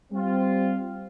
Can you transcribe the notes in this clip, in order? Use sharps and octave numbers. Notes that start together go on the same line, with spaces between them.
G3 C4 F4